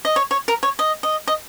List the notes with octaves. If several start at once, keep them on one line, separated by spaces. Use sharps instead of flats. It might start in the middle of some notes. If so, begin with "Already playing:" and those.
D#5
C#5
C#5
A#4
C#5
D#5
D#5
D#5